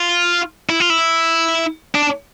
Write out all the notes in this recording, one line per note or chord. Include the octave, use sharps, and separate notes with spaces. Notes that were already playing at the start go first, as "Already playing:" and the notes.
Already playing: F4
E4
F4
E4
D4